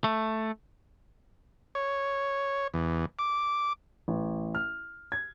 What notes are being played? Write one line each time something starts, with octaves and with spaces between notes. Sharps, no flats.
A3
C#5
E2
D6
A1
F6
G#6